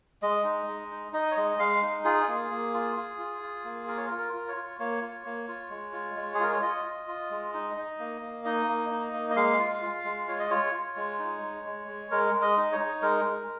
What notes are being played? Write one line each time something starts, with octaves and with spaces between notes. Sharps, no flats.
G#3 D#5
D#4
G#3
D#4
D#4 D#5
C#5
G#3 D#5
G#3 F5
D#4
F4 G#4
A#3
A#3
F4
F4
F4
F4
A#3
F4 A#4
C#5
A#4
F4
A#4
F4
C#5
F4
A#3 C#5
F4
A#3
F4
G#3
F4
G#3
G#4
F4 A#4
C#5
F4 D#5
F4
F4
G#3
D#4
D#4
A#3
A#3
D#4 D#5
A#3
D#4
A#3
D#5
G#3 F5
F4
F4
G#3
F4 C#5
D#5
F4 C#5
F4
G#3
D#4
G#3
G#3
G#3
G#3 A#4
G#3
D#5
D#4
C#5
D#4
G#3 A#4
G#3